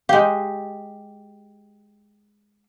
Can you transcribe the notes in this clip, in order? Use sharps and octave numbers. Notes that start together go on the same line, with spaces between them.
G#3 G4 F5